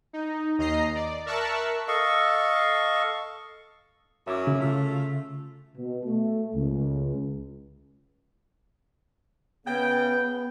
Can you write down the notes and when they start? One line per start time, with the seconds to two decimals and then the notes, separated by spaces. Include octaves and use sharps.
0.13 D#4
0.58 D#2 D#5 A#5 C7
0.95 D5
1.26 A#4 E5 A5 C#6 E6 F#6
1.88 A4 D#5 F5 C#6
4.27 F#2 E4 E5 D6
4.47 C#3
4.59 A3 F4
5.77 B2
6.06 A3
6.55 C#2
9.66 C#3 B3 G5